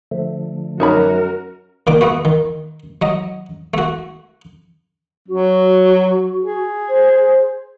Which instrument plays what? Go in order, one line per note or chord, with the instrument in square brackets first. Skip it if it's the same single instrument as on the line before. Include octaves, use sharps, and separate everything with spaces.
[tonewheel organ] D3 F3 A3
[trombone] F#2 [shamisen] D#4 C#5 B5 [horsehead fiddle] F#4 A#4
[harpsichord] A#2 D#3 D6
A3 B3 F#4
D#3
F#3 D#5
A3 F#4
[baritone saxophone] F#3 [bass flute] F#4
[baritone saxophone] G#4
[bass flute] C5